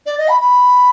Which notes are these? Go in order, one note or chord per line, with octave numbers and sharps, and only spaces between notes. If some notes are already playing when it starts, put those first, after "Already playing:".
D5
D#5
B5
B5